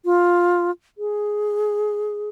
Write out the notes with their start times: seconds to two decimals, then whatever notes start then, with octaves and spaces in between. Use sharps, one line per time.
0.05 F4
0.98 G#4